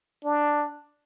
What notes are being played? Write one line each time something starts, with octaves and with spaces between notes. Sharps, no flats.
D4